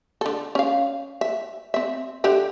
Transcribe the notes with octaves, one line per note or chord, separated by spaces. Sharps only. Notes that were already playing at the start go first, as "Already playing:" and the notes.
D3 A4
C#4 F5
E5
C4 E5
D3 G4 E5